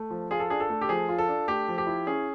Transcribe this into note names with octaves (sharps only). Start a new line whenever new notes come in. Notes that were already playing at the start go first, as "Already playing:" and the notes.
Already playing: A3
F3
F4 G#4
A4
D4 G#4
A4
A3
G4
F3 G#4
F4
A4
D4
A3 G4
F3
G4
E4
C#4 G#4